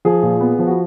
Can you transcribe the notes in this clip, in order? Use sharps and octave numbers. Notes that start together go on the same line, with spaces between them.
F3 G#4
A#2
B3
F3
F#4